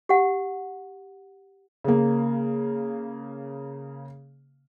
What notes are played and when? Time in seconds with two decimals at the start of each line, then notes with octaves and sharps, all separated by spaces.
0.09 G4 F#5
1.84 C#3 A#3